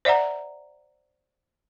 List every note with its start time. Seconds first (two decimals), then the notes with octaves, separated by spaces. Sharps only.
0.05 C5 D5 E5 F#5 A#5